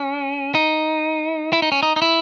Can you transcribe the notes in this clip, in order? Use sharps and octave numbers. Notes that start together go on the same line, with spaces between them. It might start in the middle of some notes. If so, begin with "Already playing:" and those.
Already playing: C#4
D#4
E4
D#4
C#4
D#4
D#4
E4